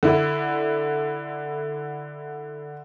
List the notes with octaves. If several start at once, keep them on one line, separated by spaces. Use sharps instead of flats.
D3 E4